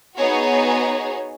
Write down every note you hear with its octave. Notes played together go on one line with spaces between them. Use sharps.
B3 D#4 F#4 G#4 C#5